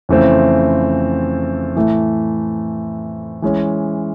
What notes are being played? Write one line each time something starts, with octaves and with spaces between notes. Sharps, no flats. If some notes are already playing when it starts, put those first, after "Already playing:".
F2 C#3 E3 A3 C4
A2 E3 A3
E3 G#3 C#4